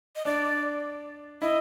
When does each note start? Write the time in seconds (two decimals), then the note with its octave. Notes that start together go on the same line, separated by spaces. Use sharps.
0.16 D#5
0.25 D4 D5
1.42 E4 D#5